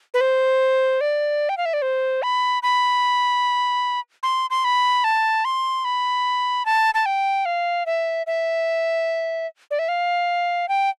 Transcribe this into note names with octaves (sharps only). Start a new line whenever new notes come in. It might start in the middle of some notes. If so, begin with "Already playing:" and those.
B4
C5
D5
G5
F5
E5
D5
C5
B5
B5
C6
C6
B5
A5
C6
B5
A5
A5
G5
F5
E5
E5
D5
E5
F5
G5